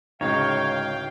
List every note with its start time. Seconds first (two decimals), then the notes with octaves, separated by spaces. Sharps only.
0.21 D1 C#3 G#3 D#4 C#5 F5 G5